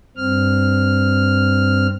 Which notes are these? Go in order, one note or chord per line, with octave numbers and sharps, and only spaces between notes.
G2 C4 F6